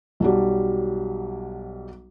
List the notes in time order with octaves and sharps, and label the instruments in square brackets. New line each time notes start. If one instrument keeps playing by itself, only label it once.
[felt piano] B1 F#3 G3